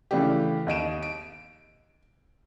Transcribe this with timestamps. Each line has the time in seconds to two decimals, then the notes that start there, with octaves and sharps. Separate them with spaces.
0.11 C#3 E3 A3 D4 G4
0.67 D#2 D#5 D7 E7
1.02 D7